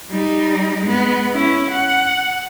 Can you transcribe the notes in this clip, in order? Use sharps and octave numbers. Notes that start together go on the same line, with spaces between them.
G3 D#4
G#3 B3
C#4 E4
F#5